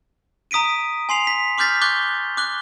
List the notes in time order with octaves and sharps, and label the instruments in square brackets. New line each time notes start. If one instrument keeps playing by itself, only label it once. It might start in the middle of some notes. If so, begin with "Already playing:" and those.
[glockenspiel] A#5 D#6 B6 D7 D#7
G#5 C6 C7 F7
B6
C6 D6 F6 G6 A6 B6
C#6 D6 F#6 G6 A6 G7
D6 F#6 G7